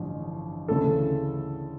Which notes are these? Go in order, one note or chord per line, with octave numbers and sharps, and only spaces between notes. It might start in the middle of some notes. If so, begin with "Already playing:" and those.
Already playing: A1 G2 D3 F3
D2 C#3 E3 A4